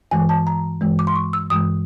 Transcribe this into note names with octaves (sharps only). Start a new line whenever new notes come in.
G2 E3 G#3 G#5
A5
A#5
G2 E3 G#3
D6
C6
C#6
E6
G2 E3 G#3 D#6